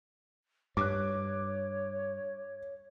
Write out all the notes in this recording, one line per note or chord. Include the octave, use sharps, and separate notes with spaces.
G2 C#5 D6 F#6